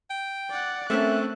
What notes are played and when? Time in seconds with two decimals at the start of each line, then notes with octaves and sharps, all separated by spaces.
0.10 G5
0.50 D5 F#5
0.90 A3 C4 C#4 A4 A#4 E5 F#6